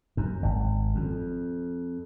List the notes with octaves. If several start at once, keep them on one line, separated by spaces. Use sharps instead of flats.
F#2
G#1
F2